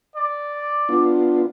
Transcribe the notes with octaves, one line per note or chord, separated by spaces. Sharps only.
D5
B3 D4 F4